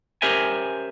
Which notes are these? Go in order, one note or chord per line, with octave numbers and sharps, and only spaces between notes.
C#4 G4 A#4 C5 E5 G#5